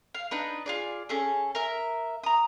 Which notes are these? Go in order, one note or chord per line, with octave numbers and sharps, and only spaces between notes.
F5
D4 D#4 B4
F4 G#4 D5
C#4 G#4 A4
A#4 E5
A#5 D#6